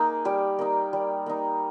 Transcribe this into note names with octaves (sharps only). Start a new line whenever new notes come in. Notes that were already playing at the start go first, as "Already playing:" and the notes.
Already playing: A#3 D#4 G#4
G3 G4
A#3 D#4
G3
A#3 D#4